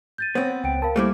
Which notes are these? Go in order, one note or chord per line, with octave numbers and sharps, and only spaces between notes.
G6 A6 D#7
B3 C4 C5 C#5
C#2 G5 D7
A#4 F5 A5 B5
G3 A3 A#3 E4 G4 C5 D6